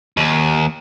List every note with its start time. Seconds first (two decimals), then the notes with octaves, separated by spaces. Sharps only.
0.17 D#2